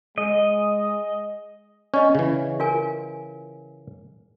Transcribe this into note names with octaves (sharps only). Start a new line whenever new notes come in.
G#3 D#5
C#4 D5 D#5
C#3 E3
F4 A#4 G#5